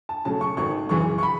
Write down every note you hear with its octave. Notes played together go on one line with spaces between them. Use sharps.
A5
C#3 F#3 A3 A5
C#6
G#1 C#6
F#2 C#3 E3 G#3 C#6
C#6
B5